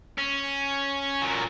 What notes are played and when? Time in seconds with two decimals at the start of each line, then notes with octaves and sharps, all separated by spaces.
0.18 C#4
1.22 A#2 F#3